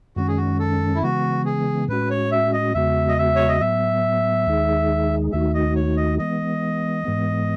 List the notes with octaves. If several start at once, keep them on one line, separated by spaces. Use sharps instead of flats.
F#2 D#3 G#3 C#4 F#4
G#4
F#4
A4
E4
C#3 E3 G#3 B3 F#4
G#4
A2 G#3 C#4 F#4 B4
C#5
E5
D#5
E2 C#3 G#3 B3 F#4 E5
D#5
E5
C#5
D#5
A2 F#3 B3 E5
D#2 D#3 G#3 D#4 G#4
D#2 D#3 A3 D#4 F#4 E5
D#5
C#5
D#5
E3 G#3 B3 D#5
G#2 E3 G#3 B3